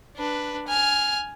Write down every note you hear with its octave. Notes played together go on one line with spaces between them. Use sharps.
D4 B4
G#5 F6